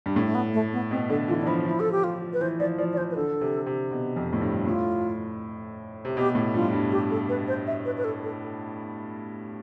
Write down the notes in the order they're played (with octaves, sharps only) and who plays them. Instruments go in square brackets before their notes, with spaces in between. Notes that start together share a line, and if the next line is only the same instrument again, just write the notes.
[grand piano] G2
[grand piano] A2 [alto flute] D4
[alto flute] A3
B3
A3
B3
[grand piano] B2 [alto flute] C4
[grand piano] D3 [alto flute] A4
[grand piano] E3 [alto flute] F4
[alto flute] D4
[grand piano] F3 [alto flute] E4
[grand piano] F3 [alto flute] E4
[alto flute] A4
G4
F4
B4
[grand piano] E3 [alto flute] C5
[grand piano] F3 [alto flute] D5
[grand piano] F3 [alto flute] D5
[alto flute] D5
[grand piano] E3 [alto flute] C5
[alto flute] B4
[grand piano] D3 [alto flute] A4
[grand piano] C3
C3
B2
F2
A2
G2
[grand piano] A2 [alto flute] F4
[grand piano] C3
[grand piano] B2 [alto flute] G4
[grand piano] A2
[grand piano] G2 [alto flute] F4
[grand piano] G2
[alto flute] G4
A4
B4
C5
E5
B4
B4
A4
A4